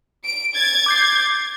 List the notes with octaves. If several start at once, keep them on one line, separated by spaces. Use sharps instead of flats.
D7
G#6 A6
D6 G6 C7